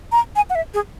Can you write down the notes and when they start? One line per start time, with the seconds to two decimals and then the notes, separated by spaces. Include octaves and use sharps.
0.12 A#5
0.36 G#5
0.50 F#5
0.55 E5
0.74 G#4